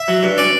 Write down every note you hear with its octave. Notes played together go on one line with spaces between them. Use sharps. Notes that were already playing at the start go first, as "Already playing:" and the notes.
Already playing: E5
F#3
G2
C#4 D5